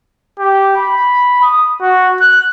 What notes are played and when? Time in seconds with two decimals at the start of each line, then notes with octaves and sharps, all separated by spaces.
0.39 G4
0.77 B5
1.43 D#6
1.81 F#4
2.20 F#6